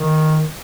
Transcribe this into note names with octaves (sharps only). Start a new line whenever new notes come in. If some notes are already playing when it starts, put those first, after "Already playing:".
Already playing: D#3